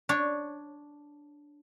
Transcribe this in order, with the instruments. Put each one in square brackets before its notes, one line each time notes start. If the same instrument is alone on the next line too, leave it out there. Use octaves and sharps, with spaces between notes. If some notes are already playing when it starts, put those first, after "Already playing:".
[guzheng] D4 C#5